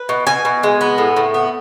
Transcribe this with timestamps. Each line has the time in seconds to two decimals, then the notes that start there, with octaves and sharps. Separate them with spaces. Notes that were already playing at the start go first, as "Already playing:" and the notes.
Already playing: B4
0.09 B2
0.27 B2 G#5
0.45 B2
0.63 G#3
0.81 B3
0.98 A2
1.17 A2
1.34 B3